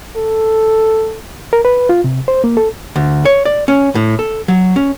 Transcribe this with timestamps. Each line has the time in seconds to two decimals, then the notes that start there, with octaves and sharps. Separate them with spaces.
0.17 A4
1.53 A#4
1.65 B4
1.89 F4
2.04 C3
2.28 C5
2.44 A#3
2.57 A4
2.96 D2
3.25 C#5
3.45 D5
3.68 C#4
3.95 A2
4.19 A4
4.48 F#3
4.76 C#4